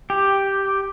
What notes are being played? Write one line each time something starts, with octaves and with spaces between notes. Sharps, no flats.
G4